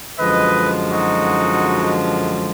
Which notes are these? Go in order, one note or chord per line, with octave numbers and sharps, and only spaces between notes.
F#2 D3 F3 G#3 B4 D#5
D#4 F#4